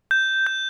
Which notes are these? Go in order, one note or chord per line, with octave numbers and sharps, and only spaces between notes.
G6
G6